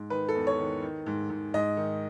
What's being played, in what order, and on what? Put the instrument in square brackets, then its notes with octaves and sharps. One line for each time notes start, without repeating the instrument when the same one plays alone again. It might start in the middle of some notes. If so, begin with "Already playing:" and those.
Already playing: [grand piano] G#2
D#3 B4
A4
E2
C#5
D#3
D#3
G#2
G#2
G#2 D#5
D#3